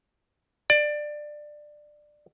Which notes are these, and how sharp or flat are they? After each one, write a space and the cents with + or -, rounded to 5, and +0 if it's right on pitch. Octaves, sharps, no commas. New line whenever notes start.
D5 +20